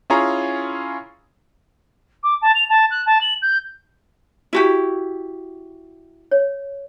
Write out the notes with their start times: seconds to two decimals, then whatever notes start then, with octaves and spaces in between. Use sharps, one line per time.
0.10 C#4 E4 F4 G#4 C#5 A#5
2.23 D6
2.42 A5
2.55 F7
2.69 A5
2.91 F#6
3.06 A5
3.21 F#7
3.42 G6
4.53 E4 F#4 G4
6.31 C#5